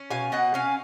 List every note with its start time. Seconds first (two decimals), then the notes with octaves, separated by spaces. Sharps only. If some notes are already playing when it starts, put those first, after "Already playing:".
Already playing: C#4
0.10 B2 F5 G#5
0.32 B2 D#5 F#5
0.54 C#4 F5 G#5